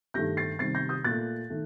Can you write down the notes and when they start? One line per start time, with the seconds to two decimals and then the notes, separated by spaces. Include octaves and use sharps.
0.14 G2 D#3 A3 G6 A#6
0.37 A6 C7
0.59 C3 D#3 G3 A6 C7
0.75 G6 A#6
0.89 D#6 G6
1.04 A#2 A3 F#6 A6
1.50 D#3 A3